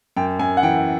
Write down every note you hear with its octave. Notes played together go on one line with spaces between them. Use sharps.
F#2 G5
F#2 G#5
F#5
E3 G5